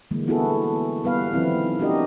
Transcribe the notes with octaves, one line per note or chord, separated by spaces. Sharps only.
D3 E3 G3 G#3 A#3
A3 B3 E4 F#4 G#4 A4
G3 B3 B4 F5
D#3 F3 B3 C4 E4
D4 D#4 F#4 G4 A#4 D#5